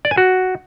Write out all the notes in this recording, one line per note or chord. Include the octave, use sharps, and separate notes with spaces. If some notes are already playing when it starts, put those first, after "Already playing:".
D5
G#5
F#4